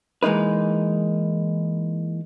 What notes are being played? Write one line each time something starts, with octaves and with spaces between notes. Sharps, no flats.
E3 G#3 A#3 D#4 B4